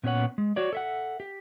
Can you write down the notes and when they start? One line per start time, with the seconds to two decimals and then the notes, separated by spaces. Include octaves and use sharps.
0.03 A#2 B3 C#4 F4 C#5 F#5
0.38 G#3
0.56 F#4 C#5 D5
0.73 A4 E5 F#5
1.20 G4